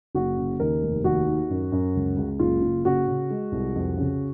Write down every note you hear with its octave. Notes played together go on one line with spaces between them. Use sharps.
F#1 F#4
C#3
D#2 A#4
F1
D#2 F#4
D#3
F#2
F#2
C#2
C#2
F#1 F4
F#1
C#3 F#4
C#3
G#3
C2
F2
C#3